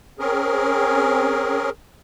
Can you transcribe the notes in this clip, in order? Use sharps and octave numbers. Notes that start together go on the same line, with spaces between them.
C4 C#4 G#4 A#4